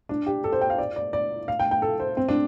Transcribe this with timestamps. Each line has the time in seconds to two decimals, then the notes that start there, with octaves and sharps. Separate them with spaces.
0.09 D4
0.26 G4
0.44 A4
0.52 C5
0.61 G5
0.70 F5
0.78 D5
0.96 D5
1.13 D5
1.48 F5
1.59 G5
1.71 G5
1.82 A4
2.00 C5
2.17 C4
2.29 D4